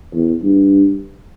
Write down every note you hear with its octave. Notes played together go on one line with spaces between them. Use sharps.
E2
G2